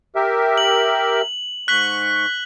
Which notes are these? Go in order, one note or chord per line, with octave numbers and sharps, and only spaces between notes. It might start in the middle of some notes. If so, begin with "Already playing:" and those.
G4 A#4 E5
F#7
G#2 C#6 F#6 B6 F#7